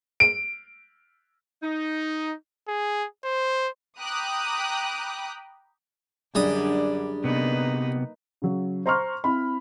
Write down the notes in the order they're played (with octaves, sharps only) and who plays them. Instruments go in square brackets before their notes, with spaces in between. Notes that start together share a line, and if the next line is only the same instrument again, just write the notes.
[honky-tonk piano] D7
[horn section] D#4
[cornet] G#4
C5
[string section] G5 A#5 B5 D6 D#6 F#6
[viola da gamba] F#2 D3 D5 [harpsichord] G3 D#5 D#6 [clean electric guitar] D4 G#4
[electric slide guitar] C3 B3 [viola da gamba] A#3 D#4 B4
[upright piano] C#3 F#3
C5 A#5 C6 C#6 F6
C4 E4 B5